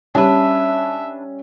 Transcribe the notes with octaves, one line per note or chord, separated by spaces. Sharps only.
G3 C#4 D4 B4 E5